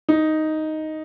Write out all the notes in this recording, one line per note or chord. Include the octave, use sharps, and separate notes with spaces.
D#4